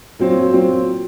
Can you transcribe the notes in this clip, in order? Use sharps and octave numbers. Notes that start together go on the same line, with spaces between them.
A#2 F#3 C4
A#2 F#3 C4